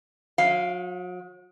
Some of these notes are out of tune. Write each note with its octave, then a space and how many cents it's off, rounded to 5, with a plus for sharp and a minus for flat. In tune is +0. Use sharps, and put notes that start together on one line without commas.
F#3 -40 F5 +0